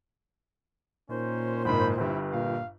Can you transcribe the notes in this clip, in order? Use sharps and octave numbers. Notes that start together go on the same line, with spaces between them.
A#2 D#3 C#4 D#4 C5
F#1 G#2 B5
G1 G2 E4
A#2 F5